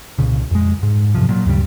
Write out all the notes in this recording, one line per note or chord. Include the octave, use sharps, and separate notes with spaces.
C2 A#2 C#3
F2 G#3
G#2
F#2 C3 F3
A#2 F#3
D2 G2 C#3 G3